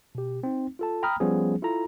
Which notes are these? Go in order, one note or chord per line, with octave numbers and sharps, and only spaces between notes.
B2 G4
C4 D#4
F4 A4 A5
G5 A#5 B5 D#6 F6
F3 G3 B3 C#4 G#4
E4 F4 A4 A#5